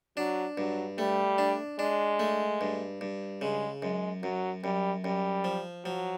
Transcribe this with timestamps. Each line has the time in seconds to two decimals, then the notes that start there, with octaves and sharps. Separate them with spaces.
0.17 F#3 D4
0.57 G2 F#3
0.98 G3 A3
1.38 D4
1.79 G#3 D4
2.20 A3
2.61 G2
3.01 G2
3.41 C#3 G#3
3.82 F#2 G#3
4.23 F#2 F#3
4.64 F#2 G3
5.04 F#2 G3
5.44 F3
5.86 F3 F#3